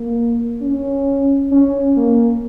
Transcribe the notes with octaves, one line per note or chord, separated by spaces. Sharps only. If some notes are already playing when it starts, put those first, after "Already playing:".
Already playing: A#3
C#4
C#4
A#3